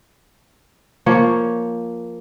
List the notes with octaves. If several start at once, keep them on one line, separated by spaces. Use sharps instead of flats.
F3 A#3 C#5